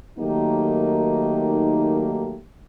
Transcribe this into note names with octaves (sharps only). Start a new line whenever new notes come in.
D#3 F#3 A3 A#3 D#4 G4